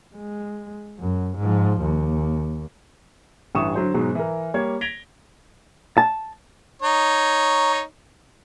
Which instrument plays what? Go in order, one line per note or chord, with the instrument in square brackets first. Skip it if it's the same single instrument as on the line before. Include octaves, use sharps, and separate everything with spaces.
[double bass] G#3
F#2
G#2 F3
D#2
[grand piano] A1 G2 E3 C#6 D#6 E7
D3 F#3 C5
G#2 B2 F#3 G#3
E3 A#4
G3 A#3 C#5 G#6
G#6 A#6 B6 D7 F7 G7
[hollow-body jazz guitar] A5
[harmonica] D#4 C#5